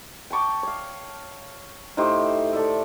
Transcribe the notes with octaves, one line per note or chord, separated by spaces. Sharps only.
G5 A5 C#6 D6
C#5 F5
A2 D#4 G4 C5
A4 D5 E5